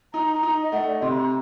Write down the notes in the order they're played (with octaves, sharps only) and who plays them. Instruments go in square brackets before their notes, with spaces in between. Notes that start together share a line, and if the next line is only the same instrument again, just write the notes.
[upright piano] D#4 [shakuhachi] A#5
[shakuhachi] A#5
[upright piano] D#4
[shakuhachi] D#5
[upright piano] A3 [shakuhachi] F#5
[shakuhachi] D5
D#5
[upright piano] C3 [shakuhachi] C6
[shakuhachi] A#5